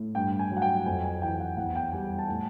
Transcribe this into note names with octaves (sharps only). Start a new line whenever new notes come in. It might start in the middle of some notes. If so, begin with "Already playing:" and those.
Already playing: A2
G2 G5
G#5
F#3
F#5
G5
F2 G#5
G#5
E3 G5
F#5
E2 F#5
G5
G3 G#5
A5
A2 G#5